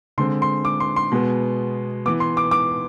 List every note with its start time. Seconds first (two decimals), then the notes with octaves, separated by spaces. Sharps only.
0.18 D3 G#3 C4 C6
0.42 C6
0.65 D6
0.80 C6
0.96 C6
1.12 B2 G#3 B3
2.06 E3 B3 D6
2.20 C6
2.37 D6
2.51 D6